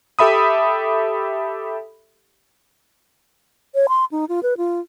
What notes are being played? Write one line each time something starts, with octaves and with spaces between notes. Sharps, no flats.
G4 A4 E5 B5 D#6
C#5
C6
D#4
F4
B4
F4